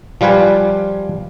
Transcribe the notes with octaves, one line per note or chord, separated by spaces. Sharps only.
F3 G3 F4 B4 G#5